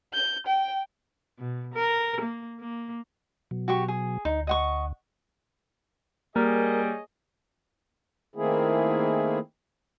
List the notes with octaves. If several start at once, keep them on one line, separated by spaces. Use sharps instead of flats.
G6
G5
B2
A#4
A#3
A#3
B2 F#3
F#4 G4 C#6
G#4
D2 D#4
D#5 F#5 C#6
G3 A#3 G#4 A#4 C#5 D#5
D#3 A3 A#3 C4 E4 G#4